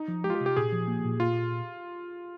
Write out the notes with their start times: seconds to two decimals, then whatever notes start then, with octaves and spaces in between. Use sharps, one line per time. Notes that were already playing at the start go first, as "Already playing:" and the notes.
Already playing: D#4
0.08 F3
0.24 G#3 G4
0.30 F4
0.35 G4
0.41 C3
0.46 G4
0.57 A#2 G#4
0.73 F3
0.88 A#3
1.04 A#2
1.20 A#2 F4